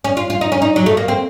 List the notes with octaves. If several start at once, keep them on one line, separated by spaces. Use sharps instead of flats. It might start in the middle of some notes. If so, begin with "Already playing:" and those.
C#4
F4
F4
D#4
C#4
D#4
F#3
A3
A#3
C4